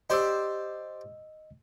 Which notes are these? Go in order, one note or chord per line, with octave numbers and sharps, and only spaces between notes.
G4 C5 D5 D#5 E6